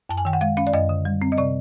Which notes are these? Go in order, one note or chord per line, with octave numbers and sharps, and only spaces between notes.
F#2 A5
G#5
D#3 G5
F#5
G#3 F5
C#4 F5
D5
F#2 D#5
D3
G3
C4
D#5
C3 D5